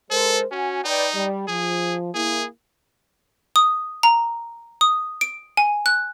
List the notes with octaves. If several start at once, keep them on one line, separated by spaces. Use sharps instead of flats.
G#3 A4 A#4 C5
C#4 F#4 G#5
D#4 B4 D5 G5
G3
F3 G#4
A#3 E4 G#4
D#6
A#5
D#6
D7
G#5
F#6